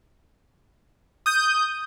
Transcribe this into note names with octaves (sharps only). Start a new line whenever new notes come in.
D#6 G6